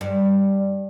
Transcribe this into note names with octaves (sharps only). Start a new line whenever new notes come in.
G2